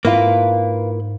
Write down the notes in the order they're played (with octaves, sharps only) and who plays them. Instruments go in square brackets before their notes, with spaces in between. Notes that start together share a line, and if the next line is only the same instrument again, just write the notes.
[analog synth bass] G#2 [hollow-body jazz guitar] A#3 E4 F4 [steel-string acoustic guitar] B4 F5